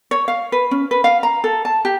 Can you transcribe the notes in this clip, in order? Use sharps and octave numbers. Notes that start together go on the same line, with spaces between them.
C#5
F5
B4
C#4
B4
F5
A#5
A4
A5
G4